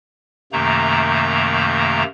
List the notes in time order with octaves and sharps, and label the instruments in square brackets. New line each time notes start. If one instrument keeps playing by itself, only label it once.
[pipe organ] F#2 C3 D#3 A3 A#3 A#5